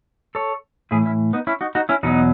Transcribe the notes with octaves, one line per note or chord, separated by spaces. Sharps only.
A4 C#5
A2 E3 E4 G#4
C#4 E4
B3 D#4
C#4 E4
D#4 F#4
D#4 F#4
C#4 E4
E2 B2 F#3 B3 D#4